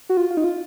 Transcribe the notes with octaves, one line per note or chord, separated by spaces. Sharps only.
F#4
F4
F4
D#4
F4